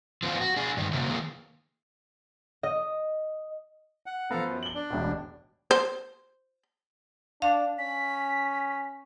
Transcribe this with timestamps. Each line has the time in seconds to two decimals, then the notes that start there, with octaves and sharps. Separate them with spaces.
0.23 F3 B3 C4 F4
0.41 F#4
0.56 D4 G#4
0.77 G2 D#3
0.93 C3 F3 F#3 A#3
1.08 D#3 A#3 G#4
2.63 D#5
4.06 F#5
4.31 F3 B3 A4 F5 A#5
4.46 F#2
4.63 F#7 G7
4.74 D4
4.90 E1 A1 B2
5.71 C5
7.42 D4 F5
7.79 C#4 B6